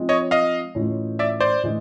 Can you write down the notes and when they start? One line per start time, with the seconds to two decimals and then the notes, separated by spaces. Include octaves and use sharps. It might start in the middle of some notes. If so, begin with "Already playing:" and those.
Already playing: F3 G#3 C4 D#4
0.09 C#5 D#5
0.31 D#5 F5
0.75 A2 E3 G#3 C#4 F4
1.19 D5 E5
1.40 C5 D5
1.63 A2 E3 G#3